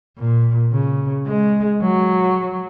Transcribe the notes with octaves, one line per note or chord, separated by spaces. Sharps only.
A#2
C#3
G#3
F#3